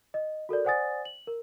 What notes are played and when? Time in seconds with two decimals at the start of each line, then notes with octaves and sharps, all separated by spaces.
0.14 D#5
0.49 F#4 A4 A#4 D5
0.65 C5 D5 F#5 G#5 D#6 A6
1.05 F#7
1.27 A#4